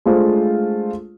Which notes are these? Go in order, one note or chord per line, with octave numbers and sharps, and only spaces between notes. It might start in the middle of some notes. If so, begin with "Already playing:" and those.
G#3 A3 D4 F4 C5